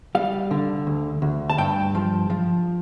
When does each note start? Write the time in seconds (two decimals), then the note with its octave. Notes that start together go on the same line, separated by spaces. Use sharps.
0.15 G3 F5
0.51 D3
0.87 D2
1.22 D2
1.50 A5
1.58 G2 G5
1.95 F3
2.30 F3